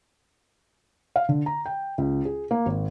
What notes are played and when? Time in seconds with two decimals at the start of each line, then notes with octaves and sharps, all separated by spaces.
1.16 F5
1.29 D3
1.46 A#5
1.66 G5
1.98 C#2
2.25 G#4
2.51 A#3
2.66 G#1